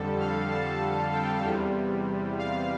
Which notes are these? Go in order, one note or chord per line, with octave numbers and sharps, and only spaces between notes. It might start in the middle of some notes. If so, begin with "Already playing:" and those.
Already playing: F2 D3 G3 A4
F5
A5
G5
E2 C3 G3
F5